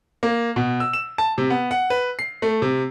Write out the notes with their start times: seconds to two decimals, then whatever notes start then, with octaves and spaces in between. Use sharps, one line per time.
0.23 A#3
0.56 B2
0.80 E6
0.93 E7
1.18 A5
1.38 C3
1.50 B3
1.71 F#5
1.90 B4
2.19 C7
2.42 A3
2.62 C3